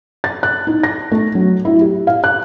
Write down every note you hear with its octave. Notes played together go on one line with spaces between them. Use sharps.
A6
F#6
D#4
A#6
A3
F#3
E4
G4
F5
F#6